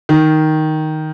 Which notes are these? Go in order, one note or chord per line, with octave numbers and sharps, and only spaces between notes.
D#3